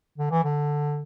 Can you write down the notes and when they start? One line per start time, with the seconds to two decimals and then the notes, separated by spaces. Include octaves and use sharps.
0.18 D3
0.31 E3
0.44 D3